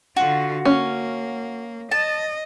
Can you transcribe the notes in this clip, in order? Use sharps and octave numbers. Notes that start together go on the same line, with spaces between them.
D3 F4 F#4
A#3 C#4
D#5 A5